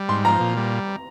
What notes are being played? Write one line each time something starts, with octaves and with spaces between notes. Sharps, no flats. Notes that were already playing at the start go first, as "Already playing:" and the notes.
Already playing: G3
G#2 C6
F3 A#5
A#2
G3